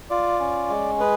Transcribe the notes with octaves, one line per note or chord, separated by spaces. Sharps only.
F4 D5
C#4
G#3
G#4 B4